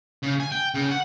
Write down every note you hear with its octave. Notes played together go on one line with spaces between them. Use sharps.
C#3
G#5
G5
C#3
F#5